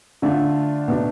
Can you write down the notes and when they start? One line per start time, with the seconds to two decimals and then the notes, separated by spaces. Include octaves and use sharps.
0.22 D3 A3 D4 F4
0.88 B2 A3 D4